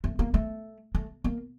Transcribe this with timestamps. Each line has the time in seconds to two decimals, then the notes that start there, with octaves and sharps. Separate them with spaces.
0.04 A3
0.19 A#3
0.34 A3
0.95 A3
1.24 A#3